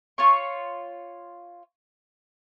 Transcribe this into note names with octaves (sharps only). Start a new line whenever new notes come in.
F4 C#5 C#6